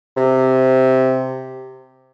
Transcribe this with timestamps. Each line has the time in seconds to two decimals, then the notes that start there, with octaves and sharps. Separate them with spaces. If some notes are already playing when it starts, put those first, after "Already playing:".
0.17 C3